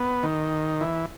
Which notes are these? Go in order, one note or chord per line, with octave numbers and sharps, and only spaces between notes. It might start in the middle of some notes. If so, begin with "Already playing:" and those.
Already playing: B3
D#3
E3